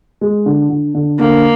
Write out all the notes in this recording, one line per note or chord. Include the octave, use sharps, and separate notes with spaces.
G#3
D3
D3
D3
D3 A#3